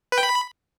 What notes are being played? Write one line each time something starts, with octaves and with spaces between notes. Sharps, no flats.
B4
G5
B5